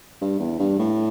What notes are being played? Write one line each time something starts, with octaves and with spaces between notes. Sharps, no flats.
G2
E2
G2
A2